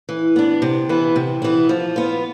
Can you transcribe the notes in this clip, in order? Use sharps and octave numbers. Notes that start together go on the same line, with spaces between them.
E3
B3 D4
C3
E3 B3 E4
C3
E3 B3 E4
F3
B3 F4